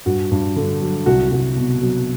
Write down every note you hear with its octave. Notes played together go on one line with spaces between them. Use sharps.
G2 F#4
G2
D3
F#3
C2 F#4
C2 F#4
B2
F#3